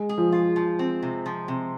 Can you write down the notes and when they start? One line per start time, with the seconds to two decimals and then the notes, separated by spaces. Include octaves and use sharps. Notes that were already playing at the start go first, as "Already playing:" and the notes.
Already playing: G#3
0.09 G#4
0.18 F3
0.32 F4
0.56 F3
0.79 C4
1.03 C3
1.26 F3
1.48 C3